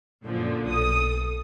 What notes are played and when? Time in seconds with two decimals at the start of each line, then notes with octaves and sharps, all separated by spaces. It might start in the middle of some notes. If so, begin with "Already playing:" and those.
0.24 F#2 A#2 D3 F3
0.67 B1 A4 D#6